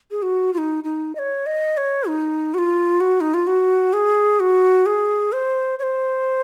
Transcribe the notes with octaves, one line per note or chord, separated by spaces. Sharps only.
G#4
F#4
F4
D#4
D#4
D#5
C#5
D#5
C#5
D#4
F#4
F4
F#4
D#4
F4
F#4
G#4
F#4
G#4
C5
C#5
C5